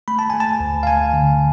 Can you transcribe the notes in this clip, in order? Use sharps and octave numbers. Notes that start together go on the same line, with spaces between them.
A3 B5
A5
A3 G#5
A5
D2
F5
A3 G#5
D3